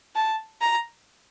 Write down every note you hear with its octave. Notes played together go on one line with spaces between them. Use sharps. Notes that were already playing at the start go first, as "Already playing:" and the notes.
A5
A#5